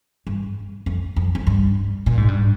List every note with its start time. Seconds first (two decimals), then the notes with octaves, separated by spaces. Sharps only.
0.27 G2
0.86 F2
1.16 F2
1.35 F2
1.47 G2
2.06 A#2
2.17 G#2
2.28 G2